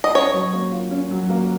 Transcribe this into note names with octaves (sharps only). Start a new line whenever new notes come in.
D#5
C#4 C#5
F#3
A#3
F4
C#4
F#3
A#3